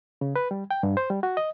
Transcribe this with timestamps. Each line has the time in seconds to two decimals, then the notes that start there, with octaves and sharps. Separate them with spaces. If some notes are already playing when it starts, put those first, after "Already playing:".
0.21 C#3
0.36 B4
0.51 G3
0.71 G5
0.83 G2
0.97 C5
1.10 G3
1.23 F#4
1.37 D#5